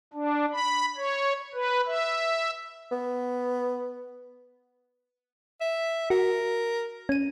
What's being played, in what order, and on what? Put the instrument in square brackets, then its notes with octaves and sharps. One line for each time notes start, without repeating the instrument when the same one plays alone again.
[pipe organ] D4
B5
C#5
B4
E5
[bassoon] B3
[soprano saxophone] E5
[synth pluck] F#4 [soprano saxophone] A#4
[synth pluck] C#4 D#7